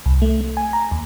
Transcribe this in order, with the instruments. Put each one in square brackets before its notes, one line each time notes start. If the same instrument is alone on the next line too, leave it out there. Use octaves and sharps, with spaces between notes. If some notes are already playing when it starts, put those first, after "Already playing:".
[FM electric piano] C2
A3
A3
G#5
A#5
D#2